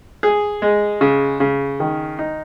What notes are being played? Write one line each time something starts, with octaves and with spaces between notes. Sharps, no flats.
G#4
G#3
C#3
C#3
D#3
D#4